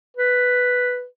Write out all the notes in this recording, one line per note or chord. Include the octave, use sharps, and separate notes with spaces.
B4